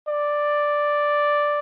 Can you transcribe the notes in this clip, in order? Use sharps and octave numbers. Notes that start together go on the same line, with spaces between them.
D5